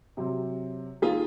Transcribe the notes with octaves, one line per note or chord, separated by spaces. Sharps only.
C3 F#3 C4
D#3 A#3 F4 G#4